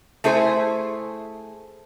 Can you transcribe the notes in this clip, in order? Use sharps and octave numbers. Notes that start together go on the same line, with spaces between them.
A3 E4 G#4 C5